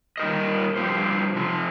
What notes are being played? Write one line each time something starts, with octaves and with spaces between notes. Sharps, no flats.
A#2 G3 D#4 A#4 D#5
G2 F3 C4 G4 C5
C3 F3 C4